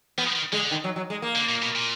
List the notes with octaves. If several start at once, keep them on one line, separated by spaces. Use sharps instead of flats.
F3 B3
D#3
D3 G#3
D#3
F#3
F#3
G#3
A#3
D3
A#2
B2
A#2